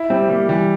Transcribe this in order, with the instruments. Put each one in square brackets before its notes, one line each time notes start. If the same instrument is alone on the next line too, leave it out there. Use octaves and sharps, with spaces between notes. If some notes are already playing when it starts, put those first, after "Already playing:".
Already playing: [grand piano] E4
[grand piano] G3 [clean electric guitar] C4
[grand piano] G3 [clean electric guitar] A#3
[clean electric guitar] E3 [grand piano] G3